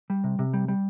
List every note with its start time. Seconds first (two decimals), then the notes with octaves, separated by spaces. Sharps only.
0.10 G3
0.24 C3
0.39 C3
0.53 G3
0.68 G3